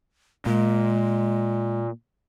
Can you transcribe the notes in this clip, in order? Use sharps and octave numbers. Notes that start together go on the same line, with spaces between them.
A#2 G#3